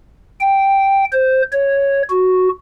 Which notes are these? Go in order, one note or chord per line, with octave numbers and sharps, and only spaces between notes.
G5
C5
C#5
F#4